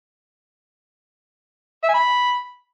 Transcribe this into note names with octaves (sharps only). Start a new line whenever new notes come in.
E5
G#5
B5